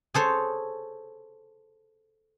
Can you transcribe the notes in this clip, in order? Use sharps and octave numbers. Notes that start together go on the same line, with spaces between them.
G#4 A4 C5 C#5